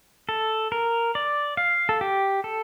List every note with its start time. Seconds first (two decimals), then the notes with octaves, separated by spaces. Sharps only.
0.29 A4
0.72 A#4
1.15 D5
1.57 F5
1.89 A4
2.01 G4
2.44 A4